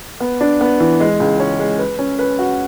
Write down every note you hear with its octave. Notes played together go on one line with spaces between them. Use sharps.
B3
D4
B3
E3
G#3
C#2
C#4
G#3
B4
C#4
B4
F#4